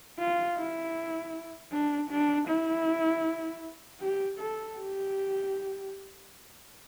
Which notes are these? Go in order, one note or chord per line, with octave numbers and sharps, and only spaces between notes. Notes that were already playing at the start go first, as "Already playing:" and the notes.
F4
E4
D4
D4
E4
G4
A4
G4